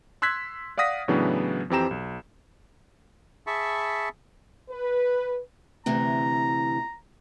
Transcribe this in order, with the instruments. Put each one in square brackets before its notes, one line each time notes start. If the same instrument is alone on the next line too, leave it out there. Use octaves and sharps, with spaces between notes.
[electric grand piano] C6 E6 F#6 G#6 B6
D5 F5 F#5 D#6 A#6 B6
A2 C#3 E3 F#3 B3 D4
F2 E3 C4 G4 A#5 E7
B1
[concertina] G#4 E5 A5 B5 C#6
[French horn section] B4
[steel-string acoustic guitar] D2 C3 E3 [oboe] A#5